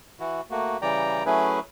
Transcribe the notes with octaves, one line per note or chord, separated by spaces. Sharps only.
E3 E4 F#4
A3 A#3 F#4
C#3 E3 G3 D5 G5 A#5
F#3 A3 C#4 E4 G#4 B4